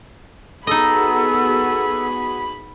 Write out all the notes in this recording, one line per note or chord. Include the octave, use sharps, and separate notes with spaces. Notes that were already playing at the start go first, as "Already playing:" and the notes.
B3 D#4 F#4 G#4 A4 D#5 B5